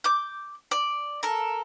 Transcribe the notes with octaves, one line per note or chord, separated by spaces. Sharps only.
D6 G6
D5
A4 A#4